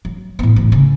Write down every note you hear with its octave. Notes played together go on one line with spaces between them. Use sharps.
F#3
A2 B3
A1 D2
C#3